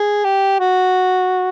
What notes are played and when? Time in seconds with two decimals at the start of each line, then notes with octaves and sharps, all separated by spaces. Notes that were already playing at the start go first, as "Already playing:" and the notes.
Already playing: G#4
0.24 G4
0.60 F#4